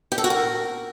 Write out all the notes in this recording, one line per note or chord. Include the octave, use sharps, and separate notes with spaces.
G4
A4
F#4
A#4